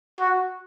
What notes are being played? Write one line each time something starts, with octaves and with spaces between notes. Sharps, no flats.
F#4